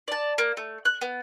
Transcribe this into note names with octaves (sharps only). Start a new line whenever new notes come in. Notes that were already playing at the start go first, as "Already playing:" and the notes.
D5 A5
A#3
A3
F#6
B3